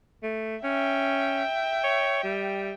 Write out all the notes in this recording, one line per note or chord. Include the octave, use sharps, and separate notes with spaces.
A3
C#4 E5 G5
C#5
G3